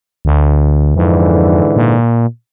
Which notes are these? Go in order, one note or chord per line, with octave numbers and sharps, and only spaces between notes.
D2
F2 G#2 D3 E3
A#2